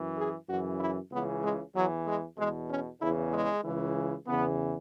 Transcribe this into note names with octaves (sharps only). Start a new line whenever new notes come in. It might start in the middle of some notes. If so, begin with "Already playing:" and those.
Already playing: F#2 E3
G#4
F#2 C#3 E3 F#4
E4
C#2 C#3 E3 B3
G#3
E2 E3 F#3
G#3
E2 B2 G#3
C#4
E2 C#3 E3 E4
G#3
C#2 C#3 E3
E2 C#3 E3 B3